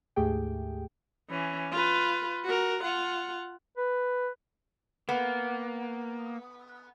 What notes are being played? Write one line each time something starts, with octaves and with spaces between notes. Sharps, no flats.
D2 G#2 A3 G4 G#4 G5
E3 C#4
F4 B4
F#4 A#4
F4 F#5
B4
A#3 B3